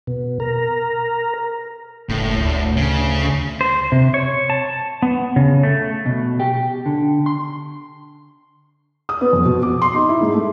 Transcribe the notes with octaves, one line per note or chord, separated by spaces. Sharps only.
B2
A#4
F#1 A2
D2
C#3
C5
C3
C#5
A5
B3
C#3
A3
B2
G4
D3
C6
D#6
B3
F2
B2
D6
C6
D#4
E4
G#2
A3